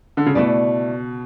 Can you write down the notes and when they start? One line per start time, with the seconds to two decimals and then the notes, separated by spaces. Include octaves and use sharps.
0.17 D3
0.26 C#3
0.35 B2 A3 E4 B4 D5